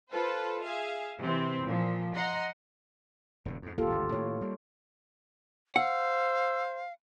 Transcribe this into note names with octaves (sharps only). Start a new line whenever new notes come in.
F4 A4 B4 C5
G#4 E5 F5
C3 E3 C4
A#2 F3
D#5 F#5 A#5 C6
E1 G2 D3
F2 G#2
D#1 A#3 F4 G4 A4
G#1 D2 G2
A2 D#3 A#3 C#5
G3 A#3
C5 F5 F#5 E6